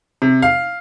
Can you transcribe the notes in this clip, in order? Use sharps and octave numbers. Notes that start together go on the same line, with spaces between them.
C3
F5